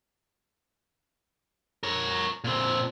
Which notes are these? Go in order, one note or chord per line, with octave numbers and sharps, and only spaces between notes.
A#4 C#5
A#2 C4